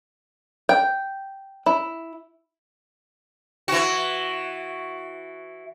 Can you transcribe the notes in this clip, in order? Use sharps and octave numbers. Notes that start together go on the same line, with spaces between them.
G5
E4
E3 F#4